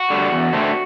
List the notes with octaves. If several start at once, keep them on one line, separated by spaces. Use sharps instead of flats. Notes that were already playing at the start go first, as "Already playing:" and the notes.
Already playing: F#4
D3 G3
E2
D3 A3 C4